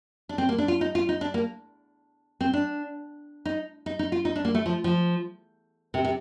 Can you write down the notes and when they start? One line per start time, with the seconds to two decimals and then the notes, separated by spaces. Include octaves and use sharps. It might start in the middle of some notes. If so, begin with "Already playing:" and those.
0.29 D4
0.38 C4
0.49 A#3
0.58 D4
0.68 F4
0.81 D#4
0.95 F4
1.09 D#4
1.21 D4
1.34 A#3
2.40 C4
2.53 D4
3.45 D#4
3.86 D#4
3.99 D#4
4.12 F4
4.25 D#4
4.36 D4
4.45 A#3
4.55 A3
4.66 F3
4.84 F3
5.94 C3
6.04 C3